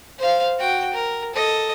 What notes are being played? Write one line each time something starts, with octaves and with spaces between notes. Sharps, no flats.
C5 F5
F#4 G5
A#4
A4 D#5